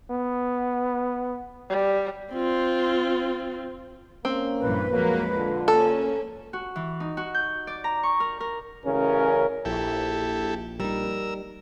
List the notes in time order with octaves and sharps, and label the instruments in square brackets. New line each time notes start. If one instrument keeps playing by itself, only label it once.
[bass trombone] B3
[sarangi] G3
[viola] C4 F4
[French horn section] A#3 C#4 [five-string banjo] C4
[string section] A#1 G2 E3 [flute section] B4
[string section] F2 G#3 [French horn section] F#3 A#3
[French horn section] D3 F4
[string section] A#3 C#4 [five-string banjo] A4
[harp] F#4
E3
D#4
F#4
G6
D5
A#5
C#6
A#4
A#4
[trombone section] A1 C#3 C#4 A#4
[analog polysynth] A#1 [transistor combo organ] E4 G4 A4
[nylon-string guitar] G3 D#4 [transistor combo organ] A#4 E6